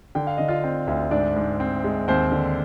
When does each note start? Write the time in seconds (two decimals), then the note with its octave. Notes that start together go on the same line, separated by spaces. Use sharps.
0.15 D3 G5
0.27 F5
0.38 D3 D#5
0.48 F4 F5
0.64 C4
0.87 D2
1.11 G#2 D4 D5
1.36 G#2
1.60 C4
1.84 G#3
2.08 D#2 C4 C5
2.32 D3